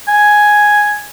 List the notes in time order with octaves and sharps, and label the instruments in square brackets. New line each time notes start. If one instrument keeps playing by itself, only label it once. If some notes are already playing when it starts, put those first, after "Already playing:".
[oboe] G#5